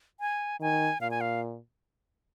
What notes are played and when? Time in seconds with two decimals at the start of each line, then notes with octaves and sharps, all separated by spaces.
0.20 G#5
0.60 D#3 G#5
1.01 A#2 F5
1.11 G#5
1.21 F5